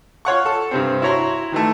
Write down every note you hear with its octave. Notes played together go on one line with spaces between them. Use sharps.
F4 C#5 F#5 C#6
A4
G2 C3 C4
E4 F#4 C#5 A#5 C6
D#3 E3 A3